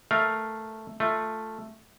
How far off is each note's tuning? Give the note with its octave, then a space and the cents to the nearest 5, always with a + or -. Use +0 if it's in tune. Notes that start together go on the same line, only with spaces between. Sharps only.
A3 +0 A#4 +10 F5 +0
A3 +0 F4 +0